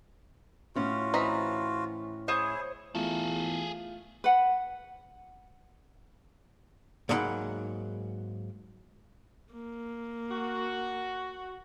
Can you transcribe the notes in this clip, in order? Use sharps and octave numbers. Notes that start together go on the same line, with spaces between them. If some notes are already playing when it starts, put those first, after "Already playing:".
A2 C#4 F4 F#4
E3 C4 D#5 A#5 B5
E4 G#4 C5 C#5 D#6
E2 A3 F4 G#4 A4
B4 F#5
G#2 F#3 A#3 F#5 A#5 B5
A#3
F#4